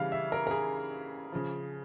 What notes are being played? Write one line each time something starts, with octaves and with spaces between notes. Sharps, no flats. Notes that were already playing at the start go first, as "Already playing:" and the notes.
Already playing: C#3 E3 G3 F5
E5
A#4
A#4
G#4
C#3 F3